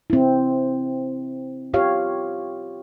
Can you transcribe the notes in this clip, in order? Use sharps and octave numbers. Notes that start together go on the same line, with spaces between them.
C4 E4
F4 G4 C#5 F5